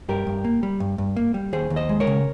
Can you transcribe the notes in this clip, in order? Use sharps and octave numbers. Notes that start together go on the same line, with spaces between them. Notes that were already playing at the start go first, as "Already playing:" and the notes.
G2 G4 A#4
G2
A#3
G3
G2
G2
A#3
G3
D#2 G#4 C5
D#2
C5 D#5
G#3
A#4 C#5
C#3